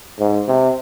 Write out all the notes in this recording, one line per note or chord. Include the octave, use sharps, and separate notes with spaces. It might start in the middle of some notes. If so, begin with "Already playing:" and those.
G#2
C3